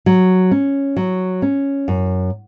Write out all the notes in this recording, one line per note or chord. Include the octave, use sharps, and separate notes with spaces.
F#3
C#4
F#3
C#4
F#2